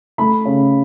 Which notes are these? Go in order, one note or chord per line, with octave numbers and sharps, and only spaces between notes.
A3 B5
C#3